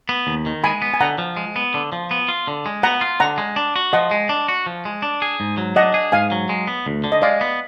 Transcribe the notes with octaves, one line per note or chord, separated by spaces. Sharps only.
B3
D#2
D#3
G#3 G#5 B5
B3
G#5
D3 F#5 A#5
F3
G#3
B3
D3
F3
B3
F4
D3
G#3
B3 F#5 A#5
F4
D3 F#5 A#5
G#3
D4
F#4
F3 D#5 F#5
G#3
D4
F#4
F3
G#3
D4
G#4
G#2
F#3
D4 D#5 F#5
G#4
G#2 F5 G#5
F#3
G#3
B3
D2
D3
D#5
G#3 D5 F5
B3